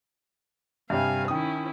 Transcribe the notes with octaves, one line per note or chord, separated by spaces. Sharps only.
G2 C3 G3 F5 G#5
D#3 C#4 E4 D#6